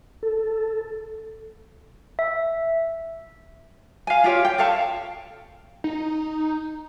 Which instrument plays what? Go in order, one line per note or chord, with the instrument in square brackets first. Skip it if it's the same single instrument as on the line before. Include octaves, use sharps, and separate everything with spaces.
[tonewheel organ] A4
[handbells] E5
[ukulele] F5 G#5
F4 G4 C#5
G5
A4 C#5 F5 A5
[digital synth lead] D#4